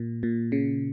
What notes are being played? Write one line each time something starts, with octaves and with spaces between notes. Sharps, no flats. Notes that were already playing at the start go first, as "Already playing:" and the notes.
Already playing: A#2
A#2
C#3